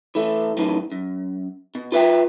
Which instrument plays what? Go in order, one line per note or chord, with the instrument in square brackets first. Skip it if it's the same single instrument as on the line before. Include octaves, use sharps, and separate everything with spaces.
[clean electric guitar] E3 A3
F#2 A2 D#3 E3
F#2
B2
F4 B4 E5 G5